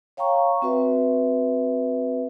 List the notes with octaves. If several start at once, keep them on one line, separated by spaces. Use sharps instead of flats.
C#5 F5 G5 A#5 C#6
C4 F#4 B4 E5